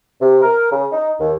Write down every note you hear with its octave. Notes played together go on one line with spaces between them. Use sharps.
C3
A#4
C#3
D#4
D#2